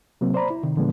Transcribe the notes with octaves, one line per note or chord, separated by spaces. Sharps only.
C3 F#3 A#3 C4
C5 D5 A#5 B5
E4
C3 D#3
A#2 D3 E3 F3 G#3 B3